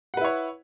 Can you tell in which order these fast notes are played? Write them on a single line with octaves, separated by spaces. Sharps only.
F#5 B4 E4 C#5